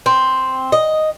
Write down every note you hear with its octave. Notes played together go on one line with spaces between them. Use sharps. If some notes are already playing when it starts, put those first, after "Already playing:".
C4
D#5